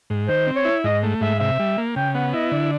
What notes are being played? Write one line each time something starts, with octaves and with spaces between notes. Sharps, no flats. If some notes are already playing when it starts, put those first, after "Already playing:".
G#2
D#3 C5
C4
C#5
E4
G#2 D#5
A3
G#2 E5
C3 E5
G3
A#3
C#3 G5
B3 F#5
E4 D#5
D3 D5